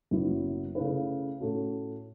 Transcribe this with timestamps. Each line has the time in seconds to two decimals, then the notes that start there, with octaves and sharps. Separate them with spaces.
0.11 F#1 F#2 F#3 B3 E4
0.75 C#3 A3 C#4 E4 B4
1.40 A2 A3 C#4 F#4